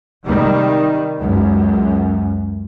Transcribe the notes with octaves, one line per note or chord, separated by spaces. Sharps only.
C3 D#3 G3
C#2 F#2